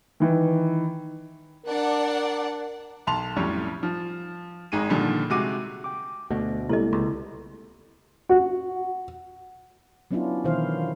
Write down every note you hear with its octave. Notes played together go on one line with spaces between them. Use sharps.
D#3 E3
D4 A#4 D5 F#5
B1 A5 C6 F7
F2 A2 F#3 G3 C#4
F3
G#1 G#3 D#4 D#7
A#2 D3 D#3 F3 G3
C3 G#3 F#4 G4 D6 D#7
G5 D6
D2 B2 A3
C2 G#3 A#3 E4 A4 D#5
C#2
F#4
F#3 B3 C#4 D4 E4 F4
B2 D#3 E3 E4 C5 F5